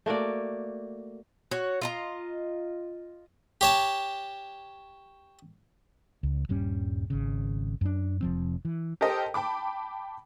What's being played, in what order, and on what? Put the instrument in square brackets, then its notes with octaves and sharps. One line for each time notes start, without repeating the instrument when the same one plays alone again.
[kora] A3 A#3 F#4 D5
[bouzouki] F#4 C#5
F4 D#5 A#5
[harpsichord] G4 C#5 A5
[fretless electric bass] C#2
D#1 G2 G3 C#4
G#1 C#3
F#2 D4
F1 F3 C4
E3
[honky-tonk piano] G4 A4 A#4 C5 D#5 G5
G5 A5 B5 D6